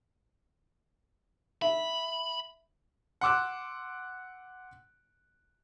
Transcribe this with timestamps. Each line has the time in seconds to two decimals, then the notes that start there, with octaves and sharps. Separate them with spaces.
1.62 E5 B5
3.21 F#5 C6 D6 E6 F#6